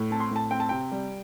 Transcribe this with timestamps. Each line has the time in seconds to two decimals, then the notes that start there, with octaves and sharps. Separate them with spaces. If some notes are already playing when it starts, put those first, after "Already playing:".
Already playing: A2
0.11 C4 A5
0.20 C6
0.31 A2 A5
0.51 C4 G5
0.60 A5
0.69 C3 G5
0.92 G3